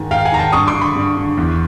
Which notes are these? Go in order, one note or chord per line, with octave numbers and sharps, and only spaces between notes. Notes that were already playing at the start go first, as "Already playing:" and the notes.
Already playing: G#2 D#3 G#5
G#2 F5 G5
F#5 G#5
D#3 A#5
G5 A5
G2 C#6 D#6
C6 D6
D3
B5 C#6
G2
D3
E2